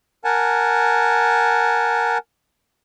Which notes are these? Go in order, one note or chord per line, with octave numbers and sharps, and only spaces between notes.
A#4 F#5 G#5 A5